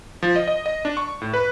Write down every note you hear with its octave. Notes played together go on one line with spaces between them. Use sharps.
F3
D#5
D#5
D#5
D4
C#6
A2
B4